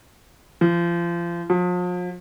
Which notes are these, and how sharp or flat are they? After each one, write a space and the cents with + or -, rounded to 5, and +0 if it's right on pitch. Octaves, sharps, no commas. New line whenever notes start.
F3 -30
F3 +40